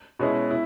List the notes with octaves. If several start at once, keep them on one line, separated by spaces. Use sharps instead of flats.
B2 G#3 C#4 E4
E4